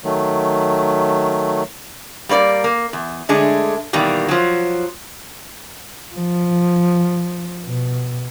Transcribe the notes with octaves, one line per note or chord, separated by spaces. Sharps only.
D#3 F#3 A3
G3 A#3 C#5 D5
A#3
E2
D3 G#3 A3 D4
B2 D#3 E3 G3 A#3
F3 F#3
F3
B2